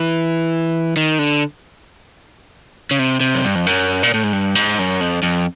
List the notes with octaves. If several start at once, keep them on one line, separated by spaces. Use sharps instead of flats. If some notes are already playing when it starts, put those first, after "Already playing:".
Already playing: E3
D#3
D3
C#3
C3
C3
F#2
G2
F2
F#2
A#2
A2
G#2
G2
G#2
F#2
F2
F2